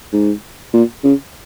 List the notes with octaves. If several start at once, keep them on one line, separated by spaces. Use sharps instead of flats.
G#2
A#2
C#3